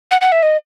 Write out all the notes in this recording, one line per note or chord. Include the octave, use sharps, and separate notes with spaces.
F#5
F#5
E5
D#5